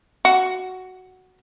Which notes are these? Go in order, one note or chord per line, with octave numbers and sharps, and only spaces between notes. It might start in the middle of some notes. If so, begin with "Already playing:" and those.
F#4